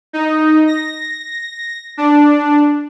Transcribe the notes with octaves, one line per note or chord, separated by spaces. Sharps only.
D#4
A#6
D4